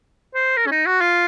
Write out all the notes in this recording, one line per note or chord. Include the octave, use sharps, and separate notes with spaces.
C5
A#4
C#4
D#4
F#4
F4